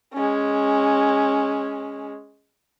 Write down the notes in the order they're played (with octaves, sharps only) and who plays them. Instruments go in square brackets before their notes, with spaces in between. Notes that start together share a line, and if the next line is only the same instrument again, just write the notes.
[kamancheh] G#3 C#4